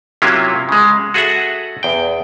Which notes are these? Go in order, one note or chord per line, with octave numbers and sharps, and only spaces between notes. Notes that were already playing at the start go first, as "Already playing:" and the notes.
C3 F#3 A#3 C#4 E4 F4
C#3 G#3
F#4 G#4 A4 E5 F#5
E2 G5